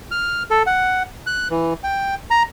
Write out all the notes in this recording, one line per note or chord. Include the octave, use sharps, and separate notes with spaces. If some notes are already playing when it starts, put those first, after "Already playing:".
F6
A4
F#5
F#6
E3
G5
A#5